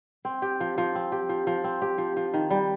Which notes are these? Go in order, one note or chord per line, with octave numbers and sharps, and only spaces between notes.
C4
G4
F3
F3
C4
G4
F3
F3
C4
G4
F3
F3
D#3
G3